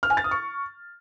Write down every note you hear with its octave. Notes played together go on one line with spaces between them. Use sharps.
F6
G#5
A6
D#6
C#6